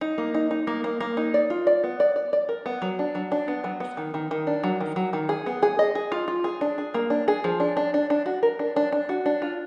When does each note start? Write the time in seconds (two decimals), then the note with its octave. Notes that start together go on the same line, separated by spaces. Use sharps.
0.01 D#4
0.18 A#3
0.35 D#4
0.51 D#4
0.67 A#3
0.84 A#3
1.00 A#3
1.17 D#4
1.34 D5
1.50 F4
1.67 D5
1.84 B3
2.00 D5
2.16 D5
2.33 D5
2.49 A#4
2.66 B3
2.82 F#3
2.99 D4
3.15 F#3
3.32 D4
3.48 B3
3.64 F#3
3.80 B3
3.97 D#3
4.14 D#3
4.31 D#3
4.47 D4
4.64 F#3
4.81 D#3
4.96 F#3
5.13 D#3
5.29 G#4
5.46 B3
5.63 G#4
5.79 D#5
5.95 G#4
6.12 F4
6.28 F4
6.44 G#4
6.61 D4
6.78 G#4
6.94 A#3
7.10 D4
7.28 G#4
7.44 F3
7.60 D4
7.77 D4
7.94 D4
8.10 D4
8.26 F#4
8.43 A#4
8.59 D4
8.76 D4
8.92 D4
9.09 F#4
9.26 D4
9.42 F4